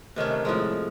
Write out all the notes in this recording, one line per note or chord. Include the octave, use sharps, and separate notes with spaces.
C3 D#3 A3 C#4
A2 F3 G#3